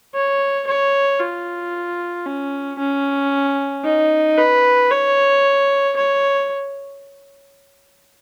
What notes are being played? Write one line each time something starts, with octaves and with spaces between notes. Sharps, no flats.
C#5
C#5
F4
C#4
C#4
D#4
B4
C#5
C#5